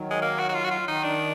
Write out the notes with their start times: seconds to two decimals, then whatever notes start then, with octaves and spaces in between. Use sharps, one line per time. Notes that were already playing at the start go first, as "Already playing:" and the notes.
Already playing: D#3 F#3
0.10 G#3
0.22 A#3
0.39 F#4
0.49 F#4
0.54 F4
0.64 F#4
0.71 F4
0.87 D#3 D#4
1.03 D4